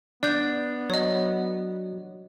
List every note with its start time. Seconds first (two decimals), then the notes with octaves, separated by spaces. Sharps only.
0.23 B3 D4 D5 G6
0.90 F#3 C#5 D#5